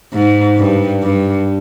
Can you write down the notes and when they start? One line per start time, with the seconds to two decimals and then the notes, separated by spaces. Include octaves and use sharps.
0.13 G#2
0.58 G2
1.03 G2